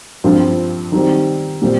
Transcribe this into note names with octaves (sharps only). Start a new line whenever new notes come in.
G2 F3 C4 F4
D#3 G3 C4
A#2 G3 C4